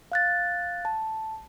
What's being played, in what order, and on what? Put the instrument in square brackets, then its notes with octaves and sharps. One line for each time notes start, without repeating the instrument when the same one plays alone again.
[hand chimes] F5 F#6 A6
A5